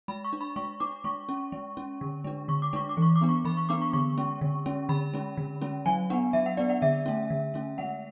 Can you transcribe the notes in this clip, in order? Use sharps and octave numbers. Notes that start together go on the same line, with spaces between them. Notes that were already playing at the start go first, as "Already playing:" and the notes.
G#3 B5
C#6
D4
B5
G#3 C#6
D4 D6
G#3 C#6
C#4
G#3
C#4
D3
G#3 D4
D3 C#6
D6
G#3 D4 C#6
D6
E3
C#6
D6
B3 D4
C#6
E3 B5
C#6
B3 D4 D6
C#6
D3 C#6
G#3 C#4
D3
G#3 C#4
D3 B5
G#3 C#4
D3
G#3 C#4
F#3 G#5
B3 D4 F#5
F#3 E5
F#5
B3 D4 D5
F#5
D3 E5
A3 C#4
D3
A3 C#4
G#3 F#5